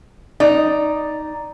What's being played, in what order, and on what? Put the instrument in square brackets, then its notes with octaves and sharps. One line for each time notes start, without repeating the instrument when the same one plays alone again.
[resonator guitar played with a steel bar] D#4 [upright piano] D5